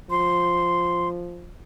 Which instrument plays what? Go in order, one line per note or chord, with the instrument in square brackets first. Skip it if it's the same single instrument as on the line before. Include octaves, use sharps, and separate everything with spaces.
[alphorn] F3 [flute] C6